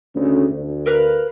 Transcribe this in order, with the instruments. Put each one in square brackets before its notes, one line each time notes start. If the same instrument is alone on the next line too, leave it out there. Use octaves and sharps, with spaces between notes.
[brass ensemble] D2 C#3
D2
[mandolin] A#4 B4 F5